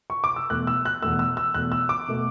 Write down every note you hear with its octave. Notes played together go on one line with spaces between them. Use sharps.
C#6
D6
E6
E2 B2 A3 F#6
E6
F#6
E2 B2 A3 E6
E6
E6
E2 B2 A3 F#6
E6
D6
B2 A3